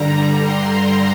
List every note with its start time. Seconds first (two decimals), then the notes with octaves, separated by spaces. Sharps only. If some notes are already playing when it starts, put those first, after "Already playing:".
Already playing: G2 D3 G3 A#5
0.40 C6